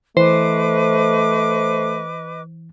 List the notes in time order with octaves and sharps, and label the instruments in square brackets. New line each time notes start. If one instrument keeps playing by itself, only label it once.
[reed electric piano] E3 [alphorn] A3 [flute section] B4 D#5 D6 [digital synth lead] C5